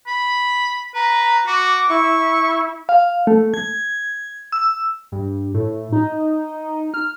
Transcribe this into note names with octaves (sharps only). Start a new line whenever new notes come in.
B5
B4 A#5
F#4 D6
E4 C#6
F5
A3
G#6
E6
G2
A2
D#4
F6